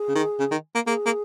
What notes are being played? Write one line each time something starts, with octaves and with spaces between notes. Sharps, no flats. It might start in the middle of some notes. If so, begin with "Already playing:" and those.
Already playing: G#4
C#3
D#3
C#3
D#3
A#3
A#3 G#4
A#3